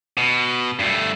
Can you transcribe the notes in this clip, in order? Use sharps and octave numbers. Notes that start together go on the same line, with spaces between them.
B2
G2 A3